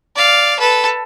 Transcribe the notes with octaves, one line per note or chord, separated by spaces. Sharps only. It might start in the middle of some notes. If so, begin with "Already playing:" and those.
D5 F5
A4 B4